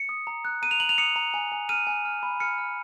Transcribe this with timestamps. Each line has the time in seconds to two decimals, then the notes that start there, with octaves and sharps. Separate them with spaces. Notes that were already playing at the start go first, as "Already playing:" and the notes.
Already playing: C#7
0.09 D#6
0.27 A#5
0.45 F#6
0.62 A#5 D#7
0.71 F7
0.80 A#5 F#7
0.89 F7
0.98 D#6 C#7
1.16 A#5
1.34 G#5
1.52 G#5
1.69 F6 D#7
1.87 G#5
2.05 F6
2.23 B5
2.40 F6 C#7
2.58 F6